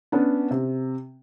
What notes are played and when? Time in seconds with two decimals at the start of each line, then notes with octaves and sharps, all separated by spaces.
0.12 B3 C#4 D4
0.51 C3